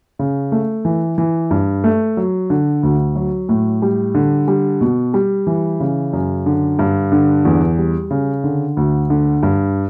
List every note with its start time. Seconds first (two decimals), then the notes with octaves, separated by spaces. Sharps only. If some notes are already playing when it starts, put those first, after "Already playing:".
0.19 C#3
0.52 A3
0.85 E3
1.18 E3
1.51 G2
1.84 A3
2.17 F#3
2.50 D3
2.83 D2
3.16 F#3
3.49 A2
3.82 G3
4.15 D3
4.48 G3
4.81 B2
5.14 G3
5.47 E3
5.80 C#3
6.13 F#2
6.46 D3
6.79 G2
7.12 D3
7.45 E2
7.78 G3
8.11 C#3
8.44 D3
8.77 D2
9.10 D3
9.43 G2